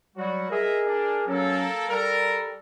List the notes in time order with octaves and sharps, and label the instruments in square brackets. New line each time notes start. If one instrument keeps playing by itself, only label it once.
[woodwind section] F#3 G3 [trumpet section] F#4
[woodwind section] G#4 A#4 [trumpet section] D#5 E5
[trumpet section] D4
[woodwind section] F#3 C#4 [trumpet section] A#3 A4
[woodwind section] G3 A4 [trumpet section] A#4